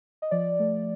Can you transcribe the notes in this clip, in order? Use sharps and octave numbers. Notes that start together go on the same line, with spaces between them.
D#5
F3 D5
A3